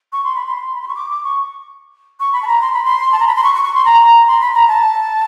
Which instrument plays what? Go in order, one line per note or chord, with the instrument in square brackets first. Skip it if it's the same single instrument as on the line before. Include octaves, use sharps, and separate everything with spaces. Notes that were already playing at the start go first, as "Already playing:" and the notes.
[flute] C#6
C6
B5
C6
B5
C6
C#6
D6
D6
C#6
C#6
B5
A5
A#5
C6
B5
C6
A5
A#5
B5
C6
C#6
C#6
C#6
C6
A#5
C6
B5
A#5
A5